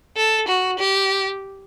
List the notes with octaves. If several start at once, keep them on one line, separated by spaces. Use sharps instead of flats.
A4
F#4
G4